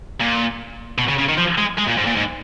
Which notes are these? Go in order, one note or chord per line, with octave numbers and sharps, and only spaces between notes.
A#2
B2
C#3
C#3
D#3
F3
G#3
G#3
A#2
G#2
A#2
G#2